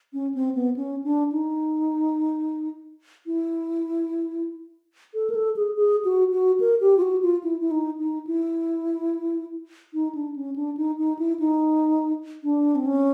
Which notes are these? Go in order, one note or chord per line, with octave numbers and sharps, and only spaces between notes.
C#4
C4
B3
C#4
D4
D#4
E4
A4
A#4
A4
G#4
G#4
F#4
F#4
A#4
G4
F4
F#4
F4
E4
E4
D#4
D#4
E4
D#4
D4
C#4
D4
D#4
D#4
E4
D#4
D4
C4
C#4